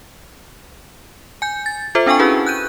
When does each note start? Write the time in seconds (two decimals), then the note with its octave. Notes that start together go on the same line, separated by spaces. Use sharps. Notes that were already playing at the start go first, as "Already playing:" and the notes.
1.42 G#5 G6
1.66 A6
1.95 F4 A4 C5 E5
2.06 C4 D4 A4 G5 G#5 C#6
2.19 C#4 E4 F#4 G#4 B4
2.46 F#6 G6 D#7